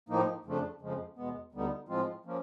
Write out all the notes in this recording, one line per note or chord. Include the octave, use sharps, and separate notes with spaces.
A2 F3 A#3 D#4
F2 C#3 F3 A3 D4
F2 C#3 F3 G#3
E2 B2 G#3 B3
D2 D3 G3 B3 D#4
A2 F3 G#3 C4 F4
F3 A#3 C#4